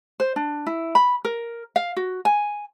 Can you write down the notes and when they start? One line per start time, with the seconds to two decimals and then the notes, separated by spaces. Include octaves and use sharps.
0.20 C5
0.36 D4
0.67 E4
0.95 B5
1.25 A#4
1.76 F5
1.96 F#4
2.25 G#5